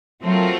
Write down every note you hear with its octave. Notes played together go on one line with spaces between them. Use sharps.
F#3 A3 C4 F4 A#4